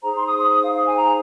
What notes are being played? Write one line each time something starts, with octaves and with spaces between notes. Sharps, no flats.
D#4 G#4 C5 A#5
C6
D#6
D#6
D#6
F5
F5
G#5
A#5